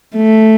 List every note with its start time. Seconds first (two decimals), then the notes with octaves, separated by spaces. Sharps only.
0.16 A3